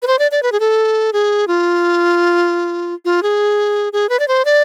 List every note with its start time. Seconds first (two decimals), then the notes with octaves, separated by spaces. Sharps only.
0.02 B4
0.07 C5
0.19 D5
0.31 D5
0.43 B4
0.52 G#4
0.60 A4
1.13 G#4
1.48 F4
3.05 F4
3.23 G#4
3.93 G#4
4.09 B4
4.20 D5
4.28 C5
4.45 D5